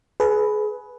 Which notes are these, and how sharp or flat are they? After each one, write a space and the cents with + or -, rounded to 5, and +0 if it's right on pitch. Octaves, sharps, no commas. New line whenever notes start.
G#4 +30 B4 +0